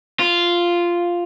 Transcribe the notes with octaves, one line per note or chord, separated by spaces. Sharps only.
F4